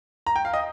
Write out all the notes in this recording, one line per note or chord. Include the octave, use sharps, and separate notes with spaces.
A#5
G5
F5
D#5